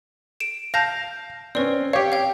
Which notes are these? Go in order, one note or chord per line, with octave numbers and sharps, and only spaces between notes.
D7 E7
F5 A5 G6 A#6
C4 C#4 B4 D5
G4 C#5 F5 G5
F5 G5